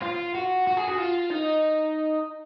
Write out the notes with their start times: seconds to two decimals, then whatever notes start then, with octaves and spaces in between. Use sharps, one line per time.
0.03 F4
0.35 F#4
0.67 F#4
0.77 G#4
0.88 F#4
0.98 F4
1.30 D#4